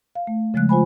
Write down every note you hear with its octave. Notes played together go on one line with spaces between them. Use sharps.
F5
A3
C#3 F3 G#3 A3 F#6
F4 C5 G#5 B5